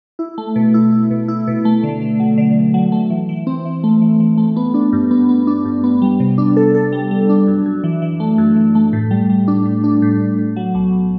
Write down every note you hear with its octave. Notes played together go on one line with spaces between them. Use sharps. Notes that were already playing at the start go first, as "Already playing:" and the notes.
E4
A3
B2
E4
E4
B2
E4
B2
A3
D3
D3
F#3
D3
D3
F#3
A3
E3
E3
C4
E3
A3
E3
E3
A3
B3
D4
G2
B3
B3
D4
G2
B3
G3
C3
D4
A4
A4
G3
G3
D4
F#2
F#2
E3
E3
A3
F#2
E3
A3
A2
G3
G3
D4
A2
D4
A2
A2
A2
F#3
B1
B1